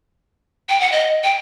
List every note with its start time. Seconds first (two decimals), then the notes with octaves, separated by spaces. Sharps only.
0.69 G5
0.80 F#5
0.92 D#5
1.24 G5